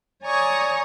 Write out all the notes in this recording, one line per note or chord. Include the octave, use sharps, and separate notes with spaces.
C#5 D5 G#5 A#5 C#6 D#6